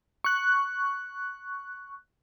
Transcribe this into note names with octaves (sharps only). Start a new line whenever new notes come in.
C#6 F#6